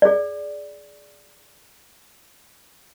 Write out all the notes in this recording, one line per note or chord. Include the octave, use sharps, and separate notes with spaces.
G#4 D5